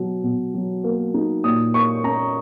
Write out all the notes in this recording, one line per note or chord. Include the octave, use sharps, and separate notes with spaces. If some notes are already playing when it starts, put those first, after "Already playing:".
Already playing: B2 F#3
B2
F#3
A#3
D#4
A#2 D#6
A#3 C#6
C#4 A#5